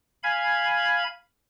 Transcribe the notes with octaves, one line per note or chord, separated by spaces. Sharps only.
F5 G#5 B5 G#6